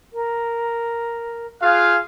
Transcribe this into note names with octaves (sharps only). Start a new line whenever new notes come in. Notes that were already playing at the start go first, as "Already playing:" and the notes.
A#4
F4 G#4 F5 F#6